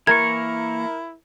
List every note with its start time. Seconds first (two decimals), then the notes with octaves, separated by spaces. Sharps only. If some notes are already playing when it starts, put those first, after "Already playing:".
0.07 E3 A#3 E4 A#4 C#6 G#6